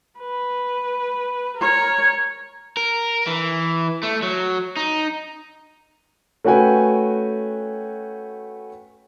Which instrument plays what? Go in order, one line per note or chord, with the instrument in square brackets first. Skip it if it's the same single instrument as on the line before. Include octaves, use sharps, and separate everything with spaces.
[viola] B4
A#4 C#5
[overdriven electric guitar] A#4
E3
A3
F#3
D#4
[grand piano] A3 C#4 F#4 B4 G5 G#5